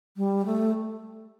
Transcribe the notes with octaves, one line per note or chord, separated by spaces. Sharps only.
G3
A3